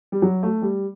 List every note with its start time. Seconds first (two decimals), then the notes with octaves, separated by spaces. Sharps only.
0.12 G3
0.22 F#3
0.43 A3
0.62 G3